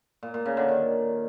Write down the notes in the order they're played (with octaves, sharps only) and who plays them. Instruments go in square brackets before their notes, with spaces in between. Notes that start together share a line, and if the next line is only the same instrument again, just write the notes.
[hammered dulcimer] A#2
A#2
C#3
D3
D#3